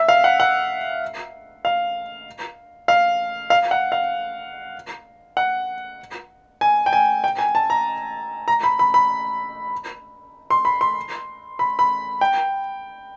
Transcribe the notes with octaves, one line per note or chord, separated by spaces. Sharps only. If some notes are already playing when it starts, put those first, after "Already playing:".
Already playing: E5
F5
F#5
F#5
F5
F5
F5
F#5
F5
F#5
G#5
G5
G#5
G5
G#5
A5
A#5
A#5
B5
B5
B5
C6
B5
C6
B5
B5
G5